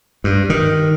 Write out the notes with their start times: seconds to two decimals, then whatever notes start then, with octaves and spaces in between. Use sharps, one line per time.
0.24 G2
0.50 D#3